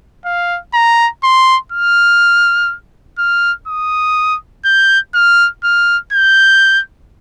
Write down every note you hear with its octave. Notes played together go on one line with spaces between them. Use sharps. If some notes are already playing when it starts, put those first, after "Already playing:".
F5
A#5
C6
F6
F6
D#6
G6
F6
F6
G6